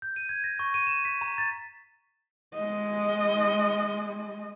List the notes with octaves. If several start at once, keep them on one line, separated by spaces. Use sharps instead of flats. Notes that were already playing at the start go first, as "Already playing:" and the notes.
G6
D#7
G#6
A#6
C#6
D#7
E7
B6
A#5
A6
G#3 D#5